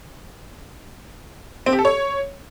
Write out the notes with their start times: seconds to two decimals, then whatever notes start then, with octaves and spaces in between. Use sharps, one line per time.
1.66 C4
1.72 G4
1.79 A4
1.85 C#5